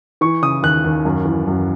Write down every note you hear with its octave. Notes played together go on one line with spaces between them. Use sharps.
E3 C#6
C#3 D#6
D#2 F#6
D#2
F#2
E3
F#2